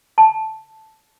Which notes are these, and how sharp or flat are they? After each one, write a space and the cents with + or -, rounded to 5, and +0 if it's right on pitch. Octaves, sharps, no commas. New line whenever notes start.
A5 -10